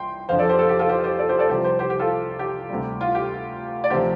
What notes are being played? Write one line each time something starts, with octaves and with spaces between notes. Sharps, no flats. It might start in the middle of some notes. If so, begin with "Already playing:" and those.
Already playing: C2 G5 C6
F2 D3 F3 C5 F5
A4 D5
G4 C5
F4 A4
G4
F4 A4
G4 C5
G4 C5
A4 D5
G4 C5
A4 D5
C2 C3 F3 G4 C5
G4 C5
G4 C5
G4
F4 A4
G4
D2 C3 G3
F4
G4
D5
D2 C3 F3 G4 C5